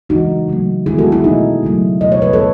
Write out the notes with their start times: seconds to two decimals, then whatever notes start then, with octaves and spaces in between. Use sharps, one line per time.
0.09 C#3 E3 G#3 D#4 F#4
0.48 C#3 F#3 A3
0.86 D#3 G#3 B3 E4 G#4
0.98 F#4 A4
1.12 E4 G#4
1.24 B2 A3 D#4
1.63 C#3 F#3 A3
2.01 B2 A3 D#5
2.12 C#5
2.22 B4
2.33 A4 C#5